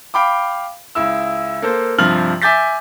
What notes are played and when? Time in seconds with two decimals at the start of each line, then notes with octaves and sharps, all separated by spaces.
0.14 F5 G5 B5 D6
0.95 C#2 E4 E6
1.62 A#3 A4 C5
1.98 G2 C3 F3 F6 F#7
2.42 E5 G#5 D6 G6 A6 B6